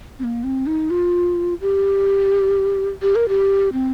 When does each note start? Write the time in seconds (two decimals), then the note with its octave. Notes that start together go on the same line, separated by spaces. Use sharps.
0.19 C4
0.24 A#3
0.44 C4
0.67 D#4
0.90 F4
1.61 G4
3.02 G4
3.16 A#4
3.29 G4
3.73 C4